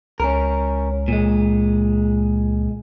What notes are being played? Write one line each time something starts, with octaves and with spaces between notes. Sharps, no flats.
C#2 C#4 A#4
A#2 G#3